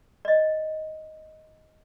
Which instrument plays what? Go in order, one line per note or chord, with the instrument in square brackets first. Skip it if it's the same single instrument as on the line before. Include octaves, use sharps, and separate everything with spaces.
[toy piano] D5 D#5